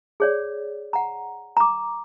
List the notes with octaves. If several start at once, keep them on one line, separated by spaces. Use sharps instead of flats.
G#4 C#5 D5
F#5 A#5
A#5 D6